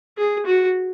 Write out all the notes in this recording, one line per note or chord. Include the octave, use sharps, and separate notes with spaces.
G#4
F#4